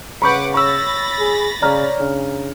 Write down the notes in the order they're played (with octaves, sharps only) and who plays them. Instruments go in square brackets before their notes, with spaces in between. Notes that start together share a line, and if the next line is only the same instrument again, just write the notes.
[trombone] C#3 [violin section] B4 F#5 D6 [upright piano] B5 C#6 G6
[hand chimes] C#5 E6 [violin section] B5 A6 A#6 [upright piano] C#6
[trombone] G#4
[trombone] C#3 [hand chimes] C#5 D5 [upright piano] A#5 F6
[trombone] C#3 [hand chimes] D4